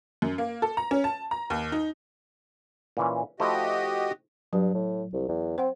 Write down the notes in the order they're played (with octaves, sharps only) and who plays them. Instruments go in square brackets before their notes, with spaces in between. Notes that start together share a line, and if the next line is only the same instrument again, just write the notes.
[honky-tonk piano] F#2
A#3
A4
A#5
C#4
A5
A#5
D#2
D#4
[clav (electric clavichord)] A#2 E3 C#4
[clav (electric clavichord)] F3 A3 E4 [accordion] F#4 G4 D#5
[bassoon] G2 [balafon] F#3
[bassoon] A2
C2
E2
[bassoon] C4 [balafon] C5 F#5